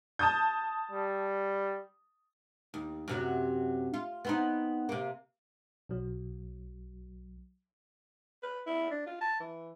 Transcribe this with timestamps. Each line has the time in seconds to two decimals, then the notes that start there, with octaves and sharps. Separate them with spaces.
0.19 A5 D#6 G6
0.91 G3
2.74 D#2
3.08 F#2 C3 F#3
3.94 F4
4.25 B3 C4 D#4
4.89 C3 A#3
5.89 B1 F#3
8.43 B4
8.67 E4
8.91 D4
9.06 F4
9.21 A5
9.40 E3